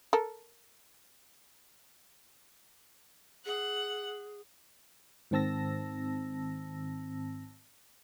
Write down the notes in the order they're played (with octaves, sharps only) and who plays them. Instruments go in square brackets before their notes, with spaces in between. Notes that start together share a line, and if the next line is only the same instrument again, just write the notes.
[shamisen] A4 A#4
[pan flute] G#4 [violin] F#5
[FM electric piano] G#2 D#3 C4 A5 E6 A#6